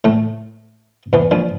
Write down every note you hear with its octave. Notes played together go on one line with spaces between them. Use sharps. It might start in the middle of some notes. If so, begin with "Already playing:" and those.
A2 A3
E2 E3
A#1 A#2